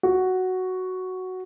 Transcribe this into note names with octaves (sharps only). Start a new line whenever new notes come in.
F#4